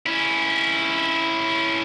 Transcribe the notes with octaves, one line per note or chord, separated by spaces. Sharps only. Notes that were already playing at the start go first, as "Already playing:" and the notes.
C#4 E4